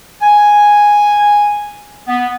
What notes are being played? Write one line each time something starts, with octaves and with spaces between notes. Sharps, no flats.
G#5
B3